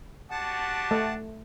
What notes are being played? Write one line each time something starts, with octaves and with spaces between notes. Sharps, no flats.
D4 F#4 G4 F#5 A5
A3